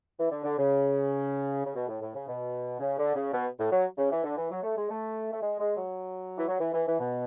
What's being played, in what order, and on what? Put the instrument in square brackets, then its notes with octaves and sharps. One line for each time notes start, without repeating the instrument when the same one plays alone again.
[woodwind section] E3
D3
D3
C#3
C#3
B2
A2
A2
C#3
B2
C#3
D3
C#3
B2
A2
F#3
C#3
E3
D3
E3
F#3
A3
G#3
A3
A3
G#3
G#3
F#3
E3
F#3
E3
E3
E3
B2